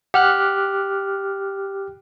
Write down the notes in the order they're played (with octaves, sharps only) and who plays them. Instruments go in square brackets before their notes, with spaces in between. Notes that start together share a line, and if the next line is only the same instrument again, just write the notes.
[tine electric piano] G4 F6 F#6 [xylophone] F#5